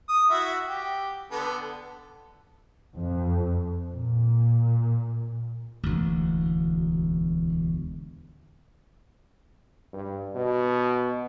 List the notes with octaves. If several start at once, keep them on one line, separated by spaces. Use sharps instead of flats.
D#6
E4 F#4 E5
G4
D3 B3 A4
F2
A#2
E1 D2
G2
B2